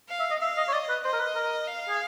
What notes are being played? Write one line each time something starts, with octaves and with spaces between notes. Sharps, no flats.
F5
E5
D#5
E5 F5
D#5
C#5
D5 D#5
B4
C5 D#5
A#4
B4
A#4
F5
G#4